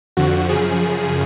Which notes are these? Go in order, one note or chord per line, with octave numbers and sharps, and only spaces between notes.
F2 D3 F3 F#4
F#2 C#3 F3 G#4